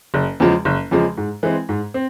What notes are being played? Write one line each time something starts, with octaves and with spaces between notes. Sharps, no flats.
F#1
E2 C#3 F3 G#3
F#1
E2 C#3 F3 G#3
G#2
E3 G#3 C4
G#2
C4